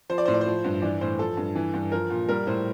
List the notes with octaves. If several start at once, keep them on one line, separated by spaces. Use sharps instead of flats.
F3 C5
D5
A2 C5
D5
C5
F3
G2
E3 D5
A2 C5
F3 A4
G2
E3
G2
F3 A#4
A#2
G3 A#4
A2 C5